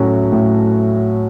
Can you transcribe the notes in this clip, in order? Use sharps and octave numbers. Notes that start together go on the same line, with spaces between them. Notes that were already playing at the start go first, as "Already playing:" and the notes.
Already playing: A2 F#3 A3 C#4 F#4
A2